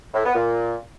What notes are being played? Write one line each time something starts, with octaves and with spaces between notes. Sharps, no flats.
A2
B3
A#2